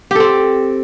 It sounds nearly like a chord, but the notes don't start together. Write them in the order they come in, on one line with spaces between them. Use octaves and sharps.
G4 A4 C4